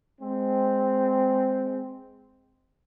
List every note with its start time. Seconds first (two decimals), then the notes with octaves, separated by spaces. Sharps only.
0.21 G#3 C4